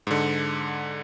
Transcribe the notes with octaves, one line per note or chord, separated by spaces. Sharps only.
G#2 D3